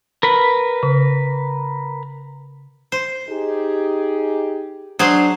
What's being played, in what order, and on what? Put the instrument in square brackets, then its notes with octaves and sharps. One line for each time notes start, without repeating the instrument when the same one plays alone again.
[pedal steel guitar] A#4 B4 B5
[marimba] C#3
[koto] C5
[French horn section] D#4 G4 G#4
[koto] F#3 G#4 C5 [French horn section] D4